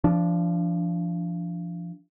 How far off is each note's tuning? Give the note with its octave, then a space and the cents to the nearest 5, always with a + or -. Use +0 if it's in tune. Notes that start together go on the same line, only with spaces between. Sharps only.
F3 -30 D4 -15